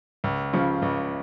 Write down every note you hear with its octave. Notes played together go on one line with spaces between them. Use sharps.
C#2
C#3 F3
C#2